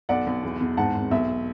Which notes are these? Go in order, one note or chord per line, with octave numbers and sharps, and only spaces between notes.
B1 D5 F#5
B1
E2
E2
G#2 F#5 A5
G#1
B1 E5